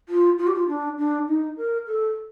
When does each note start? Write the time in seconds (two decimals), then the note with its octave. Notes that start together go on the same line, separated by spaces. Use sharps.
0.09 F4
0.39 F4
0.47 G4
0.54 F4
0.68 D4
0.98 D4
1.28 D#4
1.57 A#4
1.87 A4